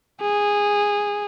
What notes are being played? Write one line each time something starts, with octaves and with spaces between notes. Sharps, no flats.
G#4